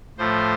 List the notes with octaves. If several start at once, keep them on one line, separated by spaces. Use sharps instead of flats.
A2 F3 A3 C5